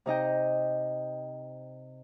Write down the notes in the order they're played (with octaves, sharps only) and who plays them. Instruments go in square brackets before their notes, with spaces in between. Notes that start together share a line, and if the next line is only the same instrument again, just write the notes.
[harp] C3 D#4 D#5 G5